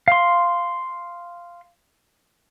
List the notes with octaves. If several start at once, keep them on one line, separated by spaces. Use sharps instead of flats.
F5 C6